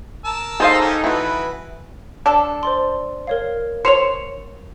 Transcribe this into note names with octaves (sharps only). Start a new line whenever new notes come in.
A#4 A5 E6
D#4 G#4 A4 C5 D#5 F5
C#4 G4
E3 E4 F#4 B4
D4 A4
C5 D5 C6
A#4 C#5 F5
C5 C#5 C#7 F7